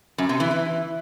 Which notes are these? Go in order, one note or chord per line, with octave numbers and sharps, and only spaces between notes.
F#2
C3
E3
E3